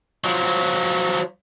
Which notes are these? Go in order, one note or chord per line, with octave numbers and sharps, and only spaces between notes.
F3 F#3